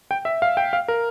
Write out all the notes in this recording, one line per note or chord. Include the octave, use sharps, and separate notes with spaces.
G5
E5
F5
G5
F5
A#4